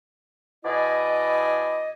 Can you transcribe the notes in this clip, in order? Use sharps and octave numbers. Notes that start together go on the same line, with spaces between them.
B2 E4 G#4 D5 D#5